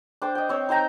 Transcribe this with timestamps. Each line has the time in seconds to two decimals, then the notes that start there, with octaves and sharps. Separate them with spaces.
0.22 D4 C5 G5
0.35 D#5 G5
0.49 C4 C#5
0.69 D#4 C5 G5 A#5